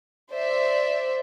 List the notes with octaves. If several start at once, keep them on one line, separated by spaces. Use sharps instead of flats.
C5 D5 E5